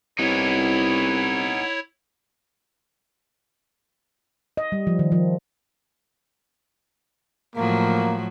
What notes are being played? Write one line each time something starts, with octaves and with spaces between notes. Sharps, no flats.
C2 B3 D#4 E4 C#5
D#5
G3
F3
D#3
F3
A2 F3 F#3 A#3